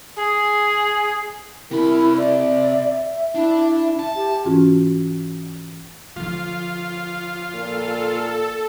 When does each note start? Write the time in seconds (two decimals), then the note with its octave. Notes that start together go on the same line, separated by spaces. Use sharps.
0.16 G#4
1.71 C3 E4 A#4 B5
2.17 D5 E5
3.35 D4 E4
3.99 A5
4.16 G4
4.45 G#2 E3 C#4 F4 F#4
6.16 D3 F3 F4
7.55 A#2 A4